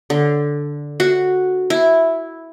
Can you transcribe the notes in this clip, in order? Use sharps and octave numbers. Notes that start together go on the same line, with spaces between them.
D3
F#4
E4